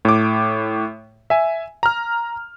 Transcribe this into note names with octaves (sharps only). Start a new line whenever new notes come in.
A2 D6
E5 G#5
A#5 F6